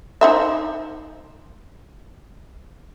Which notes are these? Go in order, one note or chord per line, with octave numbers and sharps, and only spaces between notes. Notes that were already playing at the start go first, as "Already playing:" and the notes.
D#4 C5 E5